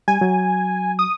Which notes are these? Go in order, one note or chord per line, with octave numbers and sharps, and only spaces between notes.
G3 G#5
F#3
D#6